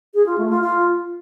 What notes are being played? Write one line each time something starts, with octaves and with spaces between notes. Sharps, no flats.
G#4
F4
A3
F4
F4